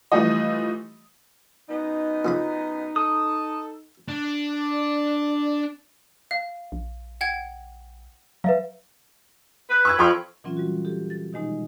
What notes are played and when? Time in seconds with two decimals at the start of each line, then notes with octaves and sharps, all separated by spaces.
0.12 E3 F3 G3 A3 E4 D#5
1.69 F#2 B3 D#4 D#5
2.25 A#2 C#3 B5
2.96 A4 D#6
4.08 D4
4.72 D5
6.31 F5
6.72 A#1
7.21 F#5 G5 G#6
8.44 F#3 B4 E5 F5
9.69 B4
9.85 C#6 E6 G#6
9.99 F2 F3 G5 B5 C#6
10.44 A#2 E3 F#3 C4 C#4 F4
10.57 G3 F#4
10.85 G4 A4
11.10 A6
11.33 B2 D#3 G#3 D#4